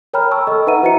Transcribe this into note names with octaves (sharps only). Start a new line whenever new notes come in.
A#4 C#5 G5 A#5 B5 F6
A5 C#6 E6
A4 D#5 E6
D#4 B4 E5 F#5 A#5 D#7
E4 F#4 C5 D#5 A#5 C#7